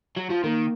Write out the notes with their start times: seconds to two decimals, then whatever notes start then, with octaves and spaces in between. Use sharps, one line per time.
0.17 F#3
0.30 F3
0.44 D#3 A#3